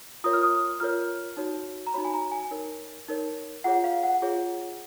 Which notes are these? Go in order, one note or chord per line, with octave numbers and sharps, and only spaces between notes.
F4 A#4 C#5 D#6
F6
D#6
F4 A#4 C#5 F6
D#4 F#4 C#5
A#5
D#4 F#4 C#5 B5
G#5
A#5
G#5
D#4 A#4 C#5
D#4 A#4 C#5
F4 G#4 C#5 F#5
F5
F#5
F4 G#4 C#5